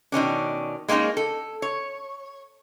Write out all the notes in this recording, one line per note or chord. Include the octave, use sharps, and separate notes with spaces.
B2 D#3 C#4 D4
G#3 A#3 C#4 D#4 G#4
A4
C#5